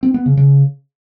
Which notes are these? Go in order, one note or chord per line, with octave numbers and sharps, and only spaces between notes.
C4
B3
C#3
C#3